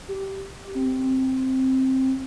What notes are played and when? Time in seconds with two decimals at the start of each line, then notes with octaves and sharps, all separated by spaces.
0.08 G4
0.75 C4